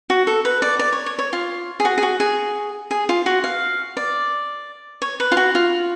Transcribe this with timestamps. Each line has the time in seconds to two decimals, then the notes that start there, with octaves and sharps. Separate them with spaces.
0.10 F#4
0.27 A4
0.45 B4
0.62 D5
0.79 D5
0.92 C#5
1.06 C#5
1.19 C#5
1.33 F4
1.80 G#4
1.85 F#4
1.98 G#4
2.03 F#4
2.20 G#4
2.91 G#4
3.09 F4
3.26 F#4
3.44 F5
3.97 D5
5.02 C#5
5.20 B4
5.32 F4
5.37 F#4
5.55 F4